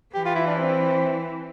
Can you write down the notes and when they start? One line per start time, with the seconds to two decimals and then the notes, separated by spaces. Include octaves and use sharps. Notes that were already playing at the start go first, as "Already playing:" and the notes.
0.15 E3 G4
0.25 F4
0.35 E4
0.47 D4
0.57 C4